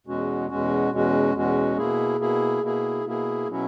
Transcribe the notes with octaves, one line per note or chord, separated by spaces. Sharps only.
E2 B2 G#3 C#4 F#4
E2 B2 G#3 C#4 F#4
E2 B2 G#3 C#4 F#4
E2 B2 G#3 C#4 F#4
B2 A#3 E4 G#4
B2 A#3 E4 G#4
B2 A#3 E4 G#4
B2 A#3 E4 G#4
B2 F#3 C#4 E4